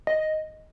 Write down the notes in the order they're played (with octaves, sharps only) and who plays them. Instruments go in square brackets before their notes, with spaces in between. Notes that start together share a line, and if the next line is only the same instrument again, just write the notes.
[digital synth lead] D#5